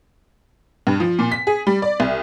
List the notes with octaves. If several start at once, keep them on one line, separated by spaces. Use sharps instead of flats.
G2
F3
A#2
B6
G#4
G3
D5
C2